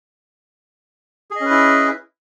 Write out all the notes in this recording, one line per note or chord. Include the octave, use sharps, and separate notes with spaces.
C#4 E4 G#4 B4 D#5